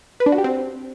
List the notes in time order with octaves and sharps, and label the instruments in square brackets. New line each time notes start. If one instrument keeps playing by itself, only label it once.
[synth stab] B4
D4
F#4
G4
C4